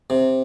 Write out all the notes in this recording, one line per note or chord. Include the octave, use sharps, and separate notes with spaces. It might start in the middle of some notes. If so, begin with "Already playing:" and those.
C3